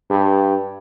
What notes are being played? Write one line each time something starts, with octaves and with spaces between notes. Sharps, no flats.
G2